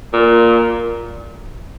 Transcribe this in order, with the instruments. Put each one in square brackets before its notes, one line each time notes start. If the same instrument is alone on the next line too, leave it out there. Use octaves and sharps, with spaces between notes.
[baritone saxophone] A#2